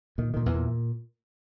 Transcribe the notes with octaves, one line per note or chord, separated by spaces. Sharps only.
A#2 D#3
A#2 D#3
E2 E3
A#2